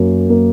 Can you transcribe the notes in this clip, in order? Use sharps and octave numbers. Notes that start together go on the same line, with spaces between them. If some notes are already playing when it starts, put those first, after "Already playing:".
Already playing: F#2 A#3
A#3